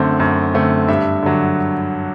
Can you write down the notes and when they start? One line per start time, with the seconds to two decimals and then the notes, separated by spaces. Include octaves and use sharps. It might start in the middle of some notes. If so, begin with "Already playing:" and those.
Already playing: F#2 D3 A3 C4
0.20 F#2
0.54 D3 A3 C4
0.88 G2 E5
1.22 D3 F#3